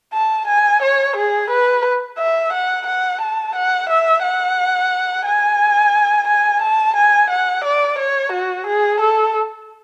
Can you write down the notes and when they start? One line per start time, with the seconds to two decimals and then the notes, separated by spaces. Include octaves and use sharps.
0.14 A5
0.48 G#5
0.82 C#5
1.17 G#4
1.50 B4
2.19 E5
2.53 F#5
2.87 F#5
3.21 A5
3.55 F#5
3.89 E5
4.23 F#5
5.26 G#5
6.28 G#5
6.62 A5
6.96 G#5
7.30 F#5
7.65 D5
7.99 C#5
8.33 F#4
8.67 G#4
9.01 A4